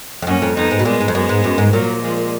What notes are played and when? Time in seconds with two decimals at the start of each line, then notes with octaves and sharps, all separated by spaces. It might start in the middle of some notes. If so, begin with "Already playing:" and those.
0.22 F2
0.27 F#2 A#3 C#4
0.42 F2
0.56 F2 B3 D#4
0.71 G#2
0.79 B2
0.85 A#2 G#3 B3
1.00 G#2
1.08 F2
1.14 F#2 G#3 B3
1.29 G#2
1.44 F#2
1.58 G#2
1.73 A#2 F#3 A#3
2.02 F3 G#3